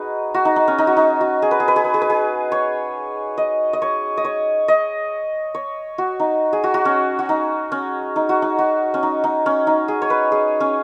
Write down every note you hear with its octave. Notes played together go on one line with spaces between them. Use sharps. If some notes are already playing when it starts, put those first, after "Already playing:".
Already playing: D#4 F#4 G#4 B4
F#4
D#4
D#4
C#4
D#4
F#4
D#4
F#4
G#4
B4
G#4
B4
G#4
B4
G#4
B4
G#4
C#5
D#5
D#5
C#5
D#5
C#5
D#5
C#5
F#4
D#4
G#4
F#4
F#4
C#4
F#4
D#4
C#4
D#4
F#4
D#4
F#4
C#4
D#4
D#4
C#4
D#4
G#4
C#5
B4
G#4
C#4